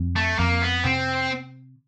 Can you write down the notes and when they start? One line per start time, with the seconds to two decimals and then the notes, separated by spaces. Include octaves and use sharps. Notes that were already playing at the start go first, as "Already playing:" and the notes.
Already playing: F2
0.16 A3
0.39 F2 A#3
0.62 B3
0.84 C3 C4